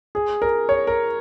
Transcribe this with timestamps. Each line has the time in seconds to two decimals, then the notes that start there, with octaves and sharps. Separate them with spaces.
0.15 G#4
0.42 A#4
0.69 C#5
0.87 A#4